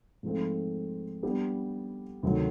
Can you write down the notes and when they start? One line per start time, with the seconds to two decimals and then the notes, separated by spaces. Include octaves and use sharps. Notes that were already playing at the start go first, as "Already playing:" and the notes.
0.23 G#2 F3 A3 C4
1.23 G3 B3 D4 G4
2.23 D2 C3 D#3 F#3 A3